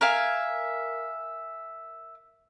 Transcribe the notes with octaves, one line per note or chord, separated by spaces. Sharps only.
A#4 E5 F5 G#5